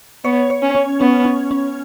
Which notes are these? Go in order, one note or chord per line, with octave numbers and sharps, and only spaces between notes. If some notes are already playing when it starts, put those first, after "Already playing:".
B3 C#5
C#5
C#4
C#4
B3 C#4
C#4
C#4